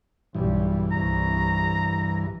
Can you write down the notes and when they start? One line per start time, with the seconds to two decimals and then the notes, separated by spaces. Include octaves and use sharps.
0.35 B1 G2 E3 G3
0.92 C2 A#5